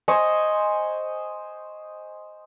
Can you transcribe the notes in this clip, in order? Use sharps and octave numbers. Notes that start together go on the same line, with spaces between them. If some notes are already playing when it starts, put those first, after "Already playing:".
C5 D#5 G#5 C#6